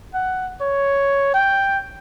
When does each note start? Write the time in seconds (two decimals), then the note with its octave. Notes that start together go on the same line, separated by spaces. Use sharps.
0.14 F#5
0.61 C#5
1.34 G5